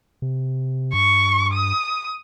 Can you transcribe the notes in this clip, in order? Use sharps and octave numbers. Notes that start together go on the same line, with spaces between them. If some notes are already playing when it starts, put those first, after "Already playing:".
C3
G2 C#6
D#6